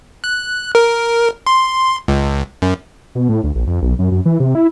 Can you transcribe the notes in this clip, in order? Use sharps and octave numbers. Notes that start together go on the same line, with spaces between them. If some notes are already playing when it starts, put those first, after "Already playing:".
F#6
A#4
C6
C#2
F#2
B2
A2
D2
A#1
F2
B1
F#2
F#2
E3
C3
E4